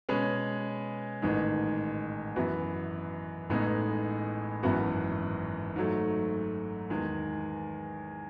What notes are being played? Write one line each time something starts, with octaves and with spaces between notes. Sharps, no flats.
B2 G#3 C#4 G#4 B4
A1 G#2 D#3 G#3 D#4
F#2 E3 B3 F#4
A1 A2 G#3 B3 D#4
G#1 F#2 E3 B3 F#4
G#2 F#3 A3
E2 D#3 G#3